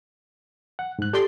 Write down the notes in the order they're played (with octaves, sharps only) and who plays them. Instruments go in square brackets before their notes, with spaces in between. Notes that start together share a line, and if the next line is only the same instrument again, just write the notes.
[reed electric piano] F#5
G#2 F#6
[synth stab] G4 D5 C6 [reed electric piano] A4